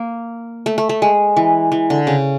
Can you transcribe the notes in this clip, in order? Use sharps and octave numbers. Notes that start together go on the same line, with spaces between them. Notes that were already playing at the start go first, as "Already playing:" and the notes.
Already playing: A#3
A3
A3
A3
G#3
E3
E3
D3
C#3